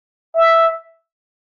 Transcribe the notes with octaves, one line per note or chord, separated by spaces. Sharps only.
E5